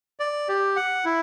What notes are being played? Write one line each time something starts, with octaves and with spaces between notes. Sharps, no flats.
D5
G4
F#5
E4